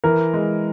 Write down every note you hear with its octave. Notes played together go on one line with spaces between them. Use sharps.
E3 A#4
G#3